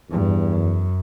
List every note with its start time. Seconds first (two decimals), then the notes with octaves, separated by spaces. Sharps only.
0.11 E2 G2
0.53 F#2